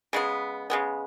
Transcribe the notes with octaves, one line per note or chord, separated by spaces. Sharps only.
C#3 G#3 B3
C#3 G#3 B3